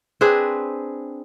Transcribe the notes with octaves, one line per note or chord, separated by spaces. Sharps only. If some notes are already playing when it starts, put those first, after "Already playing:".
C4 D4 G#4 B4